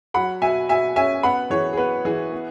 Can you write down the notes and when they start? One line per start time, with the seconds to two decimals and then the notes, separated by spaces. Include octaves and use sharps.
0.14 F#3 F#5 B5
0.41 B2 E5 G#5
0.69 B2 E5 G#5
0.96 C#4 E5 G#5
1.23 B3 F#5 B5
1.50 E3 G#4 C#5
1.73 G#4
1.77 B3 B4
2.05 E3 G#4
2.32 B3